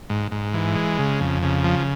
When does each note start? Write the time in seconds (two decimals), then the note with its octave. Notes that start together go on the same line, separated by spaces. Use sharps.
0.10 G#2
0.31 G#2
0.54 E3
0.76 G#3
0.98 C#3
1.21 F2
1.43 C#3
1.64 F3